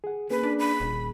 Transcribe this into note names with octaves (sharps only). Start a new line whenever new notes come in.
G#4 F#5
A#3 C#4 G#4 B4
D4
B5
D#1